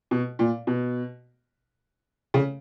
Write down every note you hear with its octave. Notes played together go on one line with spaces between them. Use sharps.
B2
A#2
B2
C#3